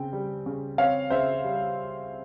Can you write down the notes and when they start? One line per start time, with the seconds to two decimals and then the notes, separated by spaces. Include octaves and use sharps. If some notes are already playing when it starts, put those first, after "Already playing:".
Already playing: C#3 C4 G5
0.13 G3
0.46 C#3
0.78 C4 C#5 F5
1.10 C#3 C5 E5
1.44 G3